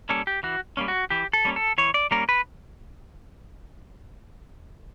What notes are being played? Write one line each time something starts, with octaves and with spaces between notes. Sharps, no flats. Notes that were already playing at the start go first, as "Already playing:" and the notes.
G3 A#3 C#4 A4
G4
E3 F#4
G3 A#3 C#4
F#4
E3 G4
A4
G3 A#3 C#4
A4
E3 C#5
D5
G3 A#3 C#4 A#4
B4